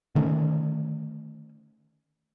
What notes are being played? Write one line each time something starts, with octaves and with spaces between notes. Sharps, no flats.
D3 D#3 A3 C#4